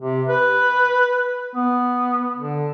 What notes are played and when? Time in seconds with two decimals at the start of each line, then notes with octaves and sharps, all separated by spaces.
0.01 C3
0.28 B4
1.56 B3
2.36 D3